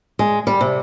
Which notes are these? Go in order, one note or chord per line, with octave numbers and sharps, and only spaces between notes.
G#3
G3
C3